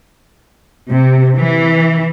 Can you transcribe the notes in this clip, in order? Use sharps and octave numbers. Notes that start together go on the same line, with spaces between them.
C3
E3